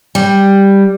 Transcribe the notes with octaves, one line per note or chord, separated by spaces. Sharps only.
G3